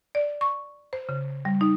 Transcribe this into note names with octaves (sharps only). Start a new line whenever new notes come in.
D5
C#6
C5
C#3
G3
D#4